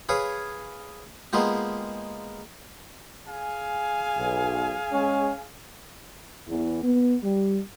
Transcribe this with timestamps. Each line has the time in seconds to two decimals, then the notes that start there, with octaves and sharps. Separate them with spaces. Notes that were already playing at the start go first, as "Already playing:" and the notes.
0.09 G#4 B4 C#5 F5
1.33 G#3 A#3 B3 F4 G4
3.27 G#4 F5 G#5
4.18 B1
4.92 G#3 C#4
6.48 E2
6.83 B3
7.23 G3